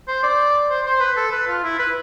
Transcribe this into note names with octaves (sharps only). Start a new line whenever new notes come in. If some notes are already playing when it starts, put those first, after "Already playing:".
C5
D5
C5
C5
B4
A4
B4
F4
E4
B4